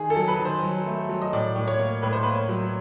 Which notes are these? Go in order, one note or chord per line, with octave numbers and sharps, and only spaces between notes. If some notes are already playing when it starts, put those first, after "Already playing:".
Already playing: D#3 G#4
A4
F#3
B4
D#3
C5
F#3
A3
F#3
D#5
A2 D5
A2
C#5
A#3
A2 B4
C5
A#3 B4
F#3